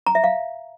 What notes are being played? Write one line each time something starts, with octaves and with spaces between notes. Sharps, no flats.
A#5
E5
F5